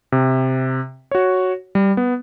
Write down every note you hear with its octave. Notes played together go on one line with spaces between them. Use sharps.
C3
F#4 C#5
G3
B3